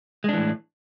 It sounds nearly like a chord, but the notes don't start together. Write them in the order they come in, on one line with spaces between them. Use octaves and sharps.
G#3 D4 E3 A2